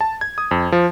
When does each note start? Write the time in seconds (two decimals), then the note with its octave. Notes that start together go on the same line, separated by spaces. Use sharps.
0.01 A5
0.21 G#6
0.38 D#6
0.51 F2
0.72 F3